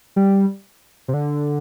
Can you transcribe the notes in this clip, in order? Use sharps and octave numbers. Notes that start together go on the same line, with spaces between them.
G3
C3
D3